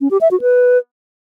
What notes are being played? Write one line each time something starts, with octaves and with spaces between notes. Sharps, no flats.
C#4
G4
E5
F#4
B4